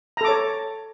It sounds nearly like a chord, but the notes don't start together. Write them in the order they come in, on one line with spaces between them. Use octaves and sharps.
A#5 A4 D6 C#5